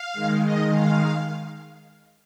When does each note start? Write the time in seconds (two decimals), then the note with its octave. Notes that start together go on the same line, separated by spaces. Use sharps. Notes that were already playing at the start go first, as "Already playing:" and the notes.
Already playing: F5
0.13 D#3 G#3
0.41 D#5
0.70 F5